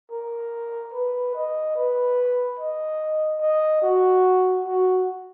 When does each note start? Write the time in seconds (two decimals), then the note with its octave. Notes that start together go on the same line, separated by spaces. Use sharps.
0.11 A#4
0.94 B4
1.35 D#5
1.76 B4
2.59 D#5
3.41 D#5
3.82 F#4
4.65 F#4